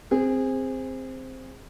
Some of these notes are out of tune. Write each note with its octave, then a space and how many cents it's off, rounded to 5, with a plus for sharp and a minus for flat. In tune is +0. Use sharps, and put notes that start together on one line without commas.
C4 +0 G#4 -20